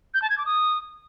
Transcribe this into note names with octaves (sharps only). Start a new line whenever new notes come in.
G6
A5
G#6
D6
D#6